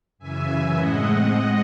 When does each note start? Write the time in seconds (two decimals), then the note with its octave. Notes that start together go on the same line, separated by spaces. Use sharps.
0.19 F#2 C#3 E3 E5 G#5
0.76 A2 G#3 C4 D#5 F#5
1.05 D#5 F#5
1.33 G#3